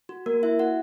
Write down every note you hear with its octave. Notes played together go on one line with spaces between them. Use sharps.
F#4
A#3 A#4
E4 E5
F#4 F#5